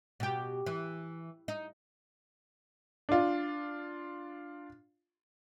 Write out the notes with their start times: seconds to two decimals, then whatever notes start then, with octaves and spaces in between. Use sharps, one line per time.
0.20 B2 G4
0.66 E3
1.48 D#4
3.09 D4 F4